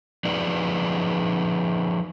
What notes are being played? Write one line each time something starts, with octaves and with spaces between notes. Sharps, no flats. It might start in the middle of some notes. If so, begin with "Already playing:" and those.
F3 D#4 G#4 B4 D5